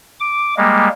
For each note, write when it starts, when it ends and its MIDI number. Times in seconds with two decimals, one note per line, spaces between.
0.20 0.54 86
0.57 0.88 55
0.57 0.88 56
0.57 0.88 58